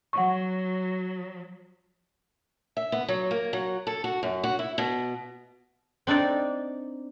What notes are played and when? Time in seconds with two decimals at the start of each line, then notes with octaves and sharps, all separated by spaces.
0.13 F#3 F#5 C#6
2.77 E5
2.92 B3
3.08 F#3
3.31 A#3
3.53 F#3
3.87 A4
4.04 F#4
4.23 F#2
4.44 F#4
4.59 E4
4.78 B2
6.07 C4 D4 D#4 D5